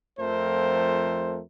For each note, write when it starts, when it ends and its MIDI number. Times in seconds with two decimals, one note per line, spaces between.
0.20 1.40 41
0.20 1.40 53
0.20 1.40 57
0.20 1.40 60
0.20 1.40 70
0.20 1.40 72